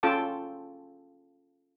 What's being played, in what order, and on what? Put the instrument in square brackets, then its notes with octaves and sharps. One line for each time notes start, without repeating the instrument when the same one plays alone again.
[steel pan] C#4 F4 A4 G5 A5 D6